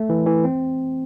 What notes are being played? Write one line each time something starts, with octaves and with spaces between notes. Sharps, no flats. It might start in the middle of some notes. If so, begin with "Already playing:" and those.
Already playing: A3
E3
E3
C4